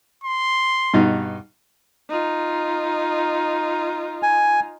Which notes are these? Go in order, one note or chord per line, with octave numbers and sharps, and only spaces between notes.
C6
G2 B2 D#4
D#4 F4
G#5